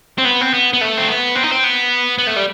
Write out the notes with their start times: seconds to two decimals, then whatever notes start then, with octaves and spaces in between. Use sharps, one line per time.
0.18 C4
0.25 B3
0.41 C4
0.53 B3
0.73 B3
0.81 A3
0.98 C4
1.08 B3
1.35 C4
1.43 D#4
1.51 C4
1.64 B3
2.18 B3
2.27 A3
2.36 G3